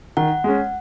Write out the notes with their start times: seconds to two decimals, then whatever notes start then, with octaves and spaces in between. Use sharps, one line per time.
0.17 D#3 F#5
0.44 G#3 C#4